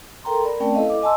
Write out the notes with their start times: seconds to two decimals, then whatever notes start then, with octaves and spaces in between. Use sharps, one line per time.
0.24 A4 A#4 G5 A#5 C6
0.44 A#4 D5 B5
0.60 A3 C4 C#4 D5 G5 A5
0.74 E4 A4 B4 D#5 F5
0.90 D6
1.02 D#5 G#5 A5 C6 E6